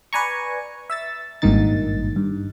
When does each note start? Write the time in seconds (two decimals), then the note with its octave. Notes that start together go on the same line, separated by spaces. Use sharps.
0.13 B4 D5 G#5 A#5 C#6
0.90 E5 E6 A6
1.42 G#1 G2 A#2 D#3 D#4 A6
2.16 G2